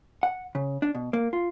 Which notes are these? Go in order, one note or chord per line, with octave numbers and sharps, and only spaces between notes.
F#5
C#3
D4
B2
A#3
F4